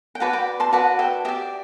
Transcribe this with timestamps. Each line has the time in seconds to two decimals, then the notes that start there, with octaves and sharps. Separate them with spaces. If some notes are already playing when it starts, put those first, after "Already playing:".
0.15 G5
0.20 F#4 B4 D5 F#5 A5
0.33 G5 B5
0.60 A5 C6
0.73 F#4 B4 D5 F#5 A5
0.99 E5 G5
1.25 G4 D5 E5